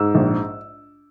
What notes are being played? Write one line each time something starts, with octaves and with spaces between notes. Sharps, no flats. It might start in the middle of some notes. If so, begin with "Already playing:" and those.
Already playing: G#2 E6
A#1